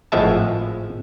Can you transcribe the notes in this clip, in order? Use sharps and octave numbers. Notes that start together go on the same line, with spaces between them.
G#1 A2 F3 G#3 E5 A5